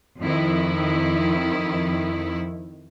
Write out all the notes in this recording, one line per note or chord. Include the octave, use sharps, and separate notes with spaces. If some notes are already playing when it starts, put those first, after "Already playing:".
F2 D#3 E4